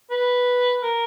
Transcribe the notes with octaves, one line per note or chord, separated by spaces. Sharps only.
B4
A#4